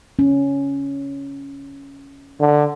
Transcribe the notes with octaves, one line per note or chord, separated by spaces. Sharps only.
C#4
D3